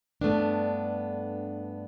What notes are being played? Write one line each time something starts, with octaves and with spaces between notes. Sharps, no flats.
G2 A3 B3 D4